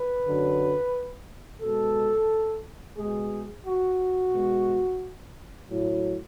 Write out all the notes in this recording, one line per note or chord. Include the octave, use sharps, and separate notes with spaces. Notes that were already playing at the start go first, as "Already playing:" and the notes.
Already playing: B4
F#2 D3 F#3
B2 G#3 A4
B2 G#3 G#4
F#4
B2 G#3
A2 F#3